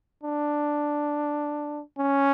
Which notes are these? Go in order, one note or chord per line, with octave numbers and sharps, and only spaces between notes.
D4
C#4